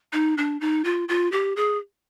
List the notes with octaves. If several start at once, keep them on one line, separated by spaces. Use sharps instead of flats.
D#4
D4
D#4
F4
F4
G4
G#4